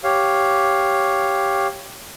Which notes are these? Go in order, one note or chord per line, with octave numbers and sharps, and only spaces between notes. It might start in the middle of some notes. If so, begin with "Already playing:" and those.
G4 C#5 F5